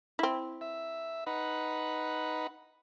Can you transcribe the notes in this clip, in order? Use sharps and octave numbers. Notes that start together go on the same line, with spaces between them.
C4 E4
E5
D#4 B4 F#5